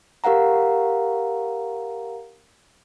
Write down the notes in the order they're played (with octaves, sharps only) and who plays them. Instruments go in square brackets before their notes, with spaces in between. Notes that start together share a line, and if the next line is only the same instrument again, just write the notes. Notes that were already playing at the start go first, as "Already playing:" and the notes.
[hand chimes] G4 A#4 F5 F#5 A#5